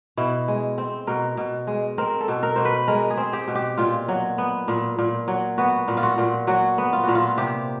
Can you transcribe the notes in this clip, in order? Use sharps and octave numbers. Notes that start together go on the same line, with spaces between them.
B2 E4
G#3
C4
B2 A#4
B2
G#3
C4 A#4
A4
B2
A#4
B2 C5
B4
G#3 A#4
G#4
C4
G4
B2
G4
A#2 F4
F#3
B3
A#2
A#2
F#3
B3 F#4
A#2
F4
F#4
A#2
F#3 F#4
B3
F4
A#2 F#4
F4
C3 G4